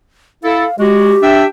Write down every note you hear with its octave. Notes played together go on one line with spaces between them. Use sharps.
E4 A4 F5
G#3 F#4 G4
D4 E5 G5